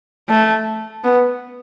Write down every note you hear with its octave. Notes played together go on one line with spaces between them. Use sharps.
A3
B3